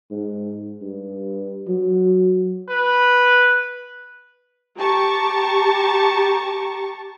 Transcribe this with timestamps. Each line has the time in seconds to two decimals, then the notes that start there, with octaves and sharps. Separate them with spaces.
0.11 G#2
0.82 G2
1.68 F#3
2.69 B4
4.77 G4 A5 A#5 C#6